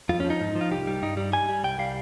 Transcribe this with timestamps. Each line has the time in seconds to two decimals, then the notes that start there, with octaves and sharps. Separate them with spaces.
0.09 F2 F4
0.20 F3 C#4
0.30 D#4
0.41 G#2
0.55 F3
0.61 F4
0.71 C2 G4
0.87 G3
1.02 G2 D#4
1.17 G3
1.33 G3 G#5
1.49 G3
1.63 C2 G5
1.79 G3 F5